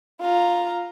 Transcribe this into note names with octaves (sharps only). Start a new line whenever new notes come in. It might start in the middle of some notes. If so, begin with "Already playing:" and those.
F4 A#5